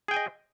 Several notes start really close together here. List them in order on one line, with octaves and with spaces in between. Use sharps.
G#4 G5 G#5 D#5